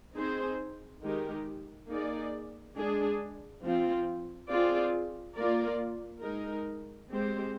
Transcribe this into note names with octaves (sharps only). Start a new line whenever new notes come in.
C4 D#4 G#4 C5
D#3 G#3 D#4 G4 A#4
A#3 D#4 G#4 D5
G#3 D4 G#4
F3 C4 F4
C4 F4 G#4 D5
A#3 F4 A#4 D5
G#3 D#4 A#4
G#3 C4 G4 C5